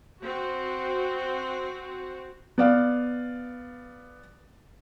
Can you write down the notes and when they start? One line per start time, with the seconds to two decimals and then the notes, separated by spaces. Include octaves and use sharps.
0.21 C4 F#4
2.58 B3 D5 F5